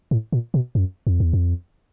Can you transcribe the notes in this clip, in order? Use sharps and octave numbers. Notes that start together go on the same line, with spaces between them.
A2
A#2
B2
F#2
F2
E2
F2